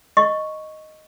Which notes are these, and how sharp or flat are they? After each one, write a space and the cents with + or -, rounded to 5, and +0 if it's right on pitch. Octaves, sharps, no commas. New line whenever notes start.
D#5 +0 C#6 +0